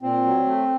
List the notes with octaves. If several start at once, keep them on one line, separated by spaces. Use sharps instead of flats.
A#2 C4
F#3
A3